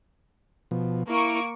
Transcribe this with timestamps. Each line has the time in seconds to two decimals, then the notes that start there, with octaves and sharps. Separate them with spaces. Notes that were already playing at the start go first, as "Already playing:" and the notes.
0.71 B2 F3
1.09 A#3 E4 C#6 D7